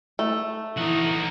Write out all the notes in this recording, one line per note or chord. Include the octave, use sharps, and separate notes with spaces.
A3
E3 D#4 F#4